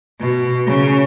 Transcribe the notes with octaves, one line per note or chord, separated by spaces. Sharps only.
B2
C#3